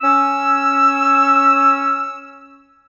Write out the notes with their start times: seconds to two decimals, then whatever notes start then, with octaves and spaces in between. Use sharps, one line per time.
0.02 C#4 E6